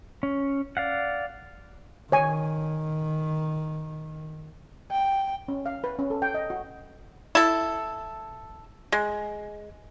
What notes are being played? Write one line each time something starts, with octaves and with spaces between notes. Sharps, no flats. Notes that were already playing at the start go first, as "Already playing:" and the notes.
C#4
D5 F5 F#5
D#3 C#5 G#5
G5
C#4
F5
B4
C#4
A4
G5
D#5
F#4
E4 A4
G#3